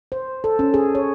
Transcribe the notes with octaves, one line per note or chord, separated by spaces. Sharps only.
C5
A4
C#4
G#4
C#5